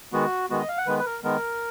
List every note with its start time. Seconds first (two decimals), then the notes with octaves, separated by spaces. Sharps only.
0.13 D#3 G#3 B3 F#4
0.50 D#3 G#3 B3 F#4
0.59 D#5
0.68 F5
0.77 F#5
0.87 D#3 G#3 B3 B4
0.99 B4
1.06 A#4
1.24 D#3 G#3 B3 A#4